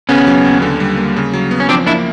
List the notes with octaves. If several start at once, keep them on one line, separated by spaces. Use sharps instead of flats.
C#3 B3 C#4
F#3
D#2
D3
G3
A#3
C#3
F#3
B3
C#4
F3 C4 D4
A#3 D4 E4